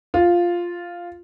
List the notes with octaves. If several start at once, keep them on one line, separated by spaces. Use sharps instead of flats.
F4